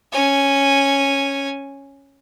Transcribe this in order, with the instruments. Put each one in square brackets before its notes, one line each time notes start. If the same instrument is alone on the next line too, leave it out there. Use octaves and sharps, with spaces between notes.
[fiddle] C#4 G#5